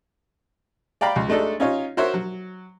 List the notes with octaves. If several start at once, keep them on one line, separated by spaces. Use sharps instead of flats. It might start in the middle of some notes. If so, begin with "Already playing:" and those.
D5 F5 G5 A#5 B5
C#2
G#3 A3 D4 D#4 A4
C#4 D#4 F4 C#5
F#4 A#4 C5 C#5 E5
F#3